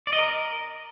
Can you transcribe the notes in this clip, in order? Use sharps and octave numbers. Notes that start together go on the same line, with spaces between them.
D5
D#5
A#4